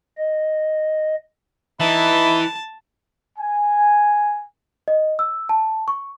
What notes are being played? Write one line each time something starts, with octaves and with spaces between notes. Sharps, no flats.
D#5
E3 D#4 E5 A5 B5
G#5
D#5
E6
A5
C#6